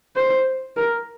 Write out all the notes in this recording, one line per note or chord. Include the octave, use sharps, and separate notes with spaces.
C5
A#4